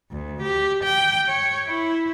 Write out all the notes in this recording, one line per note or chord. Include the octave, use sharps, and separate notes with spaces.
D2
G4
G5
C#5
E4